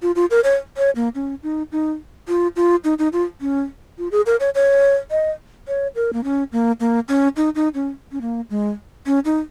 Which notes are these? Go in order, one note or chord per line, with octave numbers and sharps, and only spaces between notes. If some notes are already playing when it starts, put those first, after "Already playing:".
F4
F4
A#4
C#5
C#5
A#3
C#4
D#4
D#4
F4
F4
D#4
D#4
F4
C#4
F4
G#4
A#4
C#5
C#5
D#5
C#5
A#4
A#3
C#4
A#3
A#3
C#4
D#4
D#4
C#4
C#4
A#3
G#3
C#4
D#4